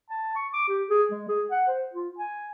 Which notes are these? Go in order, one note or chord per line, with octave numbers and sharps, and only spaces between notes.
A5
C#6
D6
G4
G#4
G#3
G#4
F#5
C5
F4
G#5